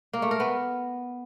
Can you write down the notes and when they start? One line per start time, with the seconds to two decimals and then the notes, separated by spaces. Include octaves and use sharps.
0.13 A#3
0.22 A3
0.31 A#4
0.40 B3